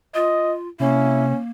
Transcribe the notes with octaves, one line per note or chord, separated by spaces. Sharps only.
F4 D#5
C3 A#3 C#4 E4